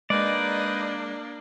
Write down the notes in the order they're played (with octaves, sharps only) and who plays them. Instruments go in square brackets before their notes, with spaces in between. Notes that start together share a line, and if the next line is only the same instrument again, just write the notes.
[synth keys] G#3 [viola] A#3 D4 [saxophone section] D#4 B4 D#5 [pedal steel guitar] D5